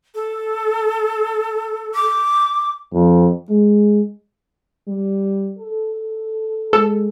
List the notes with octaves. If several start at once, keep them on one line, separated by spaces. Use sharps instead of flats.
A4
D6
F2
G#3
G3
A4
G#3 A4